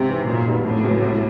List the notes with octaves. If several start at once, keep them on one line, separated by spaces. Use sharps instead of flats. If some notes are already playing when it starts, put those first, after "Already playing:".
Already playing: G#1 C3
G#2 E3
F#2 A#2
D#3 G3 B3
F2 A2
C#3 F#3 B3
C2